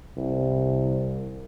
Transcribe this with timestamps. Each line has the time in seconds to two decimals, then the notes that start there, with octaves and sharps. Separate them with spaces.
0.17 C2